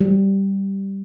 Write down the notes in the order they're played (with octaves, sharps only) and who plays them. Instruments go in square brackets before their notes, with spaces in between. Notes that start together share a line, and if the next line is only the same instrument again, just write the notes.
[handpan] G3